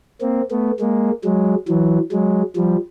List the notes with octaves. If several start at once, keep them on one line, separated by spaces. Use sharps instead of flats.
A#3 C4
A3 B3
G#3 A#3
F#3 G#3
E3 F#3
F#3 G#3
F3 G3